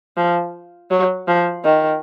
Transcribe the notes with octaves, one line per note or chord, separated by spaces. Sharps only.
F3
F#3
F3
D#3